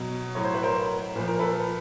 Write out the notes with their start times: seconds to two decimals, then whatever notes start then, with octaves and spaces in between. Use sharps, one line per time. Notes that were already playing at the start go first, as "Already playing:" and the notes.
Already playing: B2 F#3
0.35 A2 F#3 C#5
0.44 C5
0.54 B4
0.63 A#4 C5
1.16 A#2 F3 B4
1.27 A#4
1.39 A4 B4